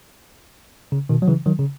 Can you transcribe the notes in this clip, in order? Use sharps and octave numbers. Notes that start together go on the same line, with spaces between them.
C#3
B2 D#3
F#3
C#3 E3
D#3 F#3
C#3